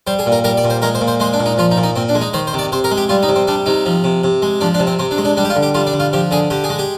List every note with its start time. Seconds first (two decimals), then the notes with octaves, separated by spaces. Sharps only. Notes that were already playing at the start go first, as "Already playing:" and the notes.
0.07 G3 C5
0.19 G#4
0.26 A#2
0.32 A#4
0.44 G3 A#4
0.57 D5
0.64 A#2
0.70 C5
0.82 G#3 A#4
0.95 C5
1.01 A#2
1.08 C5
1.20 G#3 C5
1.33 D4
1.40 A#2
1.46 D#4
1.58 F3 F4
1.71 D#4
1.77 A#2
1.83 D#4
1.96 A#2 C4
2.09 D4
2.15 G#3
2.21 D#4
2.33 D#3 C5
2.47 C5
2.54 C3
2.59 D5
2.72 C3 C5
2.84 A#4
2.91 G#3
2.97 G4
3.09 G3 F4
3.23 D#4
3.28 C3
3.36 C4
3.47 G3 D4
3.66 C3 D#4
3.86 F3
4.04 C3
4.24 C3
4.42 G#3
4.61 F3 D4
4.74 D4
4.80 C3
4.87 C4
4.99 C3 C4
5.11 D4
5.18 G#3
5.25 D4
5.37 G3 D4
5.45 G4
5.50 F4
5.55 D3
5.63 G4
5.74 G3 F4
5.87 D4
5.93 D3
6.00 F4
6.13 F3 G4
6.31 D3 G#4
6.50 D3 G4
6.64 G#4
6.69 G#3
6.79 G4